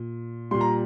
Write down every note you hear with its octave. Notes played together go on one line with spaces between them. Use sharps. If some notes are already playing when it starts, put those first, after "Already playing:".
Already playing: A#2
A#2 G3 C6
A#5